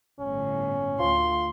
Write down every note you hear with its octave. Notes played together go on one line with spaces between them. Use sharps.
G1 A2 C#4
D2 F4 C6